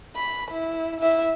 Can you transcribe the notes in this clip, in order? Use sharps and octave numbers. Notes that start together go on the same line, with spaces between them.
B5
E4
E4 E5